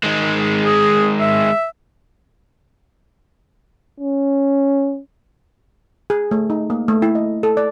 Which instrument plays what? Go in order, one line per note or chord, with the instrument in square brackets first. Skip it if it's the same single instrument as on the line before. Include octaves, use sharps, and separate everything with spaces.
[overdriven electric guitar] D#3 G#3
[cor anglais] G#4
E5
[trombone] C#4
[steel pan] G#4
A3
D#4
A#3
A3
E4
D#5
A4
D5